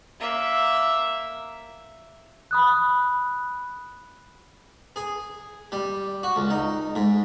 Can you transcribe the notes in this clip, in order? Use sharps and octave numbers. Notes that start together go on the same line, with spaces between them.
A#3 E5
B5 D#6 F#6
G#4
G3
F#4
C#2
D#4
G#2